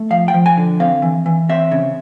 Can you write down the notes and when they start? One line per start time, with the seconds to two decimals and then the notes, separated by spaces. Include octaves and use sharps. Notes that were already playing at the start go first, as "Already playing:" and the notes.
Already playing: A3
0.10 F3 F5
0.28 G5
0.34 F3
0.46 G#5
0.57 D3
0.80 C4 F5
1.02 E3
1.26 E3
1.49 C4 E5
1.72 C#3